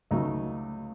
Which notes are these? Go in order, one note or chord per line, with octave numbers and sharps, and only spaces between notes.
C#2 C#3 F#3 A3 D#4